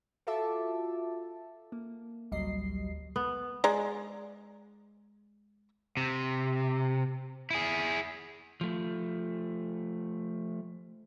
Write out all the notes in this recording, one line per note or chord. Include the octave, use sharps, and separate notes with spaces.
F4 F#4 A4 E5 A5 D6
A#3
A1 D2 F#3 G3 D#5 C7
B3
G#3 D5 A#5
C3
E4 G#4
F3 A3